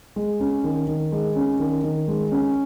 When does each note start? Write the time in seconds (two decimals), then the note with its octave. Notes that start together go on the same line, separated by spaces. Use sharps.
0.16 G#3
0.40 C#4
0.64 D#3
0.87 D#3
1.12 G#3
1.36 C#4
1.60 D#3
1.84 D#3
2.08 G#3
2.32 C#4